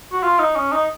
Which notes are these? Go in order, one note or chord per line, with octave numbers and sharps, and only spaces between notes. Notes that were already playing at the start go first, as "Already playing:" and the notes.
F#4
F4
D#4
C#4
D#4